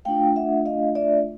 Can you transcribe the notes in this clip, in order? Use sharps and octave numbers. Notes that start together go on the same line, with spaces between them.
A3 D4 F4 F5 G5
E5 F#5
D#5 F5
D5 E5